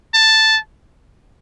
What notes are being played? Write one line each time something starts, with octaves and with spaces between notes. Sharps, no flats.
A5